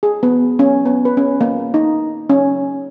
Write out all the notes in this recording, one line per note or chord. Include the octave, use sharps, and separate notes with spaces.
G#4
B3
C#4
B3
B4
C#4
A#3
D#4
C#4